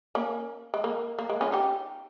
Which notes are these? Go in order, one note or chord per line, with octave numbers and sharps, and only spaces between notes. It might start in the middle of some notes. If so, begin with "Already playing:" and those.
A#3 C#4
G#3
A#3
A#3
G#3
C#4 F4
D#4 G4